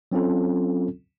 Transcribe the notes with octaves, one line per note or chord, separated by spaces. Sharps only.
F#3 C4 C#4 F4 A4